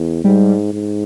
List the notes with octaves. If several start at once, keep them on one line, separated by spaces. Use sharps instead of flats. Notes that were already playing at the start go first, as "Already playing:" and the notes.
Already playing: E2
G#2 G3
G#2